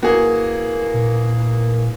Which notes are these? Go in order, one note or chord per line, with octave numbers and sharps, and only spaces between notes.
A#3 E4 F#4 G#4 B4 F5
A#2